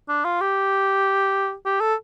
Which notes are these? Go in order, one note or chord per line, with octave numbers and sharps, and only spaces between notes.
D4
F4
G4
G4
A4